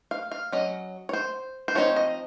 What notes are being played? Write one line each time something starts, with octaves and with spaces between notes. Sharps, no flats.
F5
F5
F#3 C#4 D#5
C#5
C5
C5
F3 C4 D#4 C#5
D#5